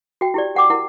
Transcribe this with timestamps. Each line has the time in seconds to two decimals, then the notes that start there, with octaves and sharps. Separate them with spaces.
0.21 F#4 G5
0.34 E4 G4 D5
0.55 G4 F#5 G5 D6
0.70 E4 A#4 F#5